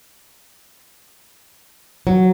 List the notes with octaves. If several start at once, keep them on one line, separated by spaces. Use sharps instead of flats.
F#3